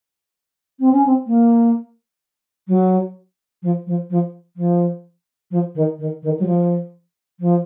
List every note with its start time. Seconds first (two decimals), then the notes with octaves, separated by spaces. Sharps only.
0.80 C4
0.93 C#4
1.06 C4
1.27 A#3
2.68 F#3
3.63 F3
3.87 F3
4.10 F3
4.57 F3
5.51 F3
5.75 D#3
5.99 D#3
6.23 D#3
6.39 F#3
6.46 F3
7.40 F3